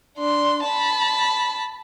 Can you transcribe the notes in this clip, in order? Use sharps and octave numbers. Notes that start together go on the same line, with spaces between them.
D4 C6
A5 B5